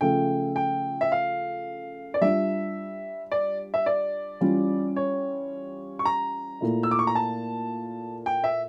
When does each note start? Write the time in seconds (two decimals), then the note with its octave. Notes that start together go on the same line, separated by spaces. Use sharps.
0.01 C#3 F3 A3 G5
0.56 G5
1.01 E5
1.12 F5
2.14 D5
2.21 G3 D4 F4 E5
3.32 D5
3.74 E5
3.86 D5
4.41 E3 G3 C#4 F4
4.96 C#5
5.99 C#6
6.05 A#5
6.61 A#2 A3 E4
6.83 E6
6.91 D6
6.99 C#6
7.07 A#5
7.15 A5
8.26 G5
8.44 E5